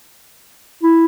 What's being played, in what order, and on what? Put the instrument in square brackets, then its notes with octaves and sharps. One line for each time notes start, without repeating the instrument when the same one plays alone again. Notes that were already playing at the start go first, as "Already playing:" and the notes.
[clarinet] E4